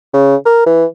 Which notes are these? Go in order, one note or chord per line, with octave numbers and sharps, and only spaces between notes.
C#3
A#4
E3